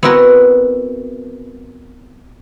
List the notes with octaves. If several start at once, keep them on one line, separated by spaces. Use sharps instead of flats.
B3 C4 E4 F#4 A#4